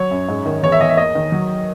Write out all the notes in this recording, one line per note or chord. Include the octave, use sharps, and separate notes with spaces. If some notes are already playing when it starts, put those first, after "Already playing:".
Already playing: F#3 C#5
F#2
G#2
D#3
E2 C#5
E5
E2 D#5
E5
A#3 D#5
D#3
F#3